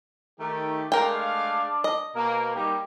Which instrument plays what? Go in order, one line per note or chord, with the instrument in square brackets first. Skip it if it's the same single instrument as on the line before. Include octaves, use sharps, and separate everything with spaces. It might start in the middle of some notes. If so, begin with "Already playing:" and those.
[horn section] D#3 A3 G4 [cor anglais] A#4
[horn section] G#3 A3 F5 [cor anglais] D4 [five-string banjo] A#4 G5
[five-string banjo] D#5
[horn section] B2 A#3 [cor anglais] A#4
[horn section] G3 A#3 D#4 [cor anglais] G4